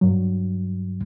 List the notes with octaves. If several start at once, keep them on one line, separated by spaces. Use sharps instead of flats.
G2 F#3